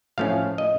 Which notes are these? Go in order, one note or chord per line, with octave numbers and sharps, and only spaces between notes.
A2 F3 A3 C#4 F5
D#5